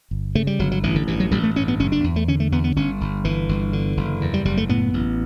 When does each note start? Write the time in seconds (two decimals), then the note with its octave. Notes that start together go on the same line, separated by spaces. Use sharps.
0.11 G1
0.35 C#3 A3
0.47 G3
0.59 G1 F#3
0.71 F#3
0.83 A1 E3
0.96 D3
1.08 G2 E3
1.20 F#3
1.31 A1 G3
1.43 A3
1.56 G2 C#4
1.68 B3
1.80 F#1 C#4
1.92 D4
2.04 E2
2.16 A3
2.28 D3 C#4
2.40 A3
2.52 E2 B3
2.64 B3
2.76 G1 C#4
3.01 G1
3.25 G1 E3
3.49 G1
3.73 D3
3.97 F#1
4.21 E2
4.34 G3
4.45 F#1 G3
4.57 A3
4.69 A2 B3
4.94 A1